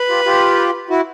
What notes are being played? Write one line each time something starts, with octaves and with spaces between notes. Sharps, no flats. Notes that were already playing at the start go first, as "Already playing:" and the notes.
Already playing: B4
F4 G4
F4 G4
E4 F#4